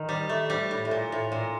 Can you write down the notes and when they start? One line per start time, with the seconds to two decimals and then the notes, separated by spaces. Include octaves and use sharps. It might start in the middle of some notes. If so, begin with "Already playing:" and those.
Already playing: D#3
0.09 G3
0.29 A3
0.50 G3
0.71 A2
0.85 A2
0.91 A#2
1.12 A2
1.32 A#2